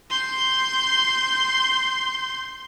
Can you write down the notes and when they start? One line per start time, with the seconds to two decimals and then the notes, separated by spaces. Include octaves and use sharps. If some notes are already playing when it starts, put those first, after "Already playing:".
0.10 C6 G6